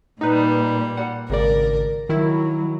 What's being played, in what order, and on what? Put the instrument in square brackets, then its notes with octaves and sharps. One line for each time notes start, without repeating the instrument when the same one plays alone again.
[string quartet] A#2 G3 [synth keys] D#4 B4
[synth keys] F#5
[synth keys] G#1 C#3 D5 [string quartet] A#4
[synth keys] D#3 E4 [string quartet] F#3